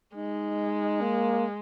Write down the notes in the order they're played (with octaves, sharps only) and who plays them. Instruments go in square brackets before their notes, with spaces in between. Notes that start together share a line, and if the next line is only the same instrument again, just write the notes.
[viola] G#3 [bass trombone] D#4
[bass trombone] A#3